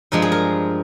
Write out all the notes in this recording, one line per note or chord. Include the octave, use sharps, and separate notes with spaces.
G2 F3 G#3 A#4
G#4
A#4